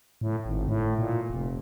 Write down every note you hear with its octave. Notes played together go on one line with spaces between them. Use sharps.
A2
G#1
A2
A#2
F1